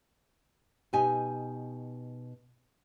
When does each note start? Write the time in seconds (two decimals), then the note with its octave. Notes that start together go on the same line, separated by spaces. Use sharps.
0.93 B2 D#4 G4 G#5